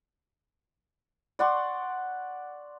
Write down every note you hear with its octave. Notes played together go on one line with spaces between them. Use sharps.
D5 F#5 C6 C#6